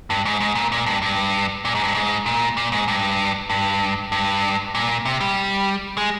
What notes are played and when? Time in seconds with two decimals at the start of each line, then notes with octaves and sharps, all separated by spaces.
0.10 G2
0.25 G#2
0.40 G#2
0.55 A#2
0.72 A#2
0.86 G2
1.02 G2
1.65 A#2
1.75 G#2
1.84 G2
1.94 G#2
2.26 A#2
2.57 A#2
2.72 G#2
2.88 G2
3.50 G2
4.12 G2
4.75 A#2
5.06 C3
5.21 G3
5.98 G#3